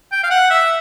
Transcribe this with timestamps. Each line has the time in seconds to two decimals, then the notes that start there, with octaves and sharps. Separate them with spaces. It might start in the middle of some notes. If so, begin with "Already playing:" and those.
0.12 G5
0.24 F5
0.31 F#5
0.50 E5